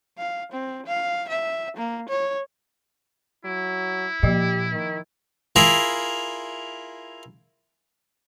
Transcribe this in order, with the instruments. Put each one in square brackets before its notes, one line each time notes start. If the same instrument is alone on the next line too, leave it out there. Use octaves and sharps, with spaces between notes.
[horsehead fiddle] F5
C4
F5
E5
A#3
C#5
[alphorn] F#3 [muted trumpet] E4
[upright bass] A#2 [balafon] F3 A#3 D#5 [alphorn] G4
[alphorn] D#3
[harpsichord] E4 F4 G#4 A#4 E5